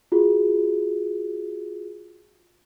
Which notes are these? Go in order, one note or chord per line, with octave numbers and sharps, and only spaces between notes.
F4 F#4 G#4